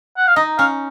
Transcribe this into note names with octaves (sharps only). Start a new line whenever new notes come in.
F#5
F5
D#4 D#5
C#4 F5